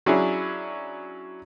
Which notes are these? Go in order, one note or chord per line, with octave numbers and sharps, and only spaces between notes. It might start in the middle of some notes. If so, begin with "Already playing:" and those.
F#3 C#4 D4 E4 G#4